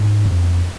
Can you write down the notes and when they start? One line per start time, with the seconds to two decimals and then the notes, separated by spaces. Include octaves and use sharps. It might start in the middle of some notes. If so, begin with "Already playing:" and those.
Already playing: G#2
0.25 F2